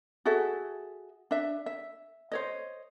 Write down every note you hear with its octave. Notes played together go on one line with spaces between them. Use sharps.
F#4 G#4 A4 E5
D4 E5
E5
C5 C#5 D#5